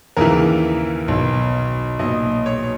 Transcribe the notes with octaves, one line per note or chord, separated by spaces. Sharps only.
D#2 C#3 E3 A#4
B1 B2
B1 A#2 D#5
C#5